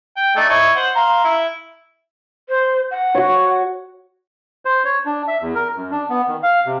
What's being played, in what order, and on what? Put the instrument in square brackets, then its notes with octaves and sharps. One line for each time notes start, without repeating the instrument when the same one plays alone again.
[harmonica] G5
A3 D4 D#4
E4 C#5 D#5
C5 F#5
F5 A#5 C6
E4
[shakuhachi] C5
F#5
[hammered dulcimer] F#4 C#5
[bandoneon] C5
C#5
D4
E5
E2
A#4
F#2
D4
B3
D#3
F5
C3